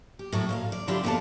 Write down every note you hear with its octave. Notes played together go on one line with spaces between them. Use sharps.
G4
A2 F#3
A#2 C#5 F5
D5
D3 F#3 D4 E4 F4 G4
F2 B3 A4 D5 F5 A5